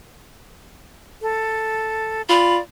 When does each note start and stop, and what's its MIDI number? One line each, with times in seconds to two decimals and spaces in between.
1.22 2.22 69
2.29 2.58 65
2.29 2.61 74
2.29 2.57 83